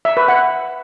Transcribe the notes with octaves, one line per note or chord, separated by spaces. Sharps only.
E5
B4
F#5